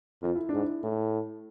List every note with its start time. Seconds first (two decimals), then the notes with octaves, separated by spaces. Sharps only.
0.22 F2 F4
0.36 E4
0.49 G#2 D4
0.62 E4
0.83 A2